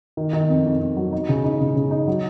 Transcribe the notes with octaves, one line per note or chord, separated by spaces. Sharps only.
D#3
D#3
F2
F2
F2
F#3
D#4
C#3
D#4
C#3
C#3
D#4
F#3